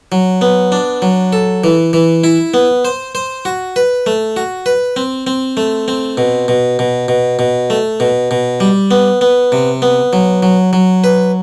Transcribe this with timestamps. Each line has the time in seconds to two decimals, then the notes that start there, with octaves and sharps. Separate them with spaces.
0.12 F#3
0.41 B3
0.72 D4
1.02 F#3
1.33 A4
1.64 E3
1.93 E3
2.24 E4
2.54 B3
2.85 C5
3.15 C5
3.45 F#4
3.76 B4
4.06 A3
4.37 F#4
4.66 B4
4.96 C4
5.27 C4
5.57 A3
5.88 C4
6.17 B2
6.48 B2
6.79 B2
7.08 B2
7.39 B2
7.70 A3
8.00 B2
8.31 B2
8.60 G3
8.91 B3
9.21 B3
9.52 C3
9.82 B3
10.13 F#3
10.43 F#3
10.73 F#3
11.04 B4